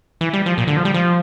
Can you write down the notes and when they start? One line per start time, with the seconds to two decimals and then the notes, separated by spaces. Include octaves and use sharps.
0.21 E3
0.33 G3
0.46 F3
0.58 A#2
0.67 D3
0.77 F3
0.85 G3
0.94 F3